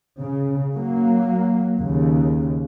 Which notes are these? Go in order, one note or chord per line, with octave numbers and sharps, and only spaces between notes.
C#3
F#3 A#3
D#2 C#3